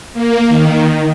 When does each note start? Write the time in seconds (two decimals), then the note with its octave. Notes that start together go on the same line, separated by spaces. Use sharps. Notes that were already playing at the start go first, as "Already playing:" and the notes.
0.14 A#3
0.49 D#3